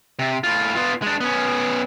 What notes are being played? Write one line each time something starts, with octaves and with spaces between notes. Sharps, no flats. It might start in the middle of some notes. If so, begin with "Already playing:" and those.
C3
A2 F4
B3 F4
G#3 D4
B3 C#4